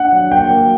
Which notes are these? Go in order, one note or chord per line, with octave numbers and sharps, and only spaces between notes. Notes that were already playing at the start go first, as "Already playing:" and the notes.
Already playing: D4 F#5
F#3
A#3 G5
A#3